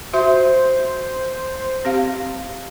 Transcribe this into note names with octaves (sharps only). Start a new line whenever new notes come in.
F#4 C5 E5
C4 G4 F5